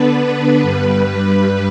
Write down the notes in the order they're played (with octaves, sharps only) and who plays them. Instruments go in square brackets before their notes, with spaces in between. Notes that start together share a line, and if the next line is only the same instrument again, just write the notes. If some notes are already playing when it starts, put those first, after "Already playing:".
Already playing: [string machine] D3 B3 D4 B4
B4
G2 G3